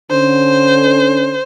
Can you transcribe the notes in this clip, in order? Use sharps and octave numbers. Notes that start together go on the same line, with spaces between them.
D3 C#4 C5